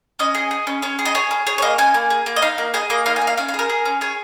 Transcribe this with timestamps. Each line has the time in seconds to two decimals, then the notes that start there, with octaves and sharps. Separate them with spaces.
0.19 C#4 D#5
0.35 G#4
0.51 G#4
0.67 C#4
0.82 C#4 C#5
0.99 G#4
1.05 D#5
1.15 G#4 C#5
1.31 C#4
1.47 G#4 C#5
1.58 C#5
1.62 A#3 D#5
1.78 C#4 G#5
1.94 A#3
2.10 G#4
2.26 A#3
2.36 D#5
2.42 D#4 F5
2.58 A#3
2.74 G#4 D#5
2.90 A#3 D#5
3.06 D#4 F5
3.16 G#5
3.22 A#3
3.27 F5
3.37 C#4 F5
3.48 F5
3.54 G#4
3.59 A#4
3.70 G#4
3.85 C#4
4.01 G#4 C#5